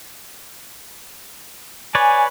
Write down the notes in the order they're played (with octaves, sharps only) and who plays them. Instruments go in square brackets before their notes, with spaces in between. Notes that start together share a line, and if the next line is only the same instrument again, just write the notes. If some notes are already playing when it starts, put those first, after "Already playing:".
[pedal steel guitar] B4 C#5 D5 [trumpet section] G#5